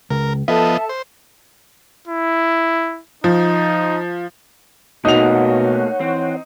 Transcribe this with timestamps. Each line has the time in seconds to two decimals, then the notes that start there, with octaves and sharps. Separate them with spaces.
0.11 C#2 A#4
0.48 F3 B3 A4 D#5 E5 A5
0.89 C5
2.08 E4
3.24 F3 D#4
5.05 B2 A3 A#3 D#4 F#4 C#5 F#5 F7
6.00 E3 C4